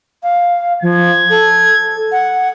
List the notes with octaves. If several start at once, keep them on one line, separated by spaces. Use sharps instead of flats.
F5
F3 G#6
A4
F#5